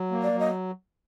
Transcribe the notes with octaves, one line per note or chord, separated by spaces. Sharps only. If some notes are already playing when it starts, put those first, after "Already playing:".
Already playing: F#3
A#3
D5
F#3
D#5